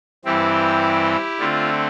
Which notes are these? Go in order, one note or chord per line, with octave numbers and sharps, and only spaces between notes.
G2 E3 G3 C4 E4 G4
D3 A3 C4 F4